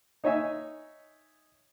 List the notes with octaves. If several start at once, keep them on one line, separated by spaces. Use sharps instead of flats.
D#4 C#5 D#5 E5 G#5